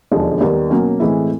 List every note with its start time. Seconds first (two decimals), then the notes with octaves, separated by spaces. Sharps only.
0.11 E1 D#2 D3 F3 G#3
0.41 D#2 D#3 G3 B3
0.70 B2 F#3 A#3 C#4
1.00 A2 E3 G#3 C4 E4